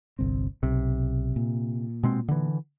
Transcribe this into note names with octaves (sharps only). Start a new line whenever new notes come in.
G1 C2 C4
B1 C3
A#2
B2 G#3 C4
D3 E3